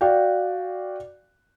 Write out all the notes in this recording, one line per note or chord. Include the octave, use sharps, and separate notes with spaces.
F#4 D5 F5 G5